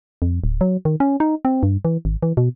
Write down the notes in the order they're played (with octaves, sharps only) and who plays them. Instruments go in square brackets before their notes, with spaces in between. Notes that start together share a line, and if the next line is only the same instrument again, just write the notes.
[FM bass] F2
D1
F#3
D#3
C#4
D#4
C4
G2
E3
G#1
E3
B2